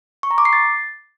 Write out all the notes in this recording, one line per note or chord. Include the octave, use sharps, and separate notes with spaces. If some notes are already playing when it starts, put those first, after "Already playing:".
C#6
A#5
D6
C7
A6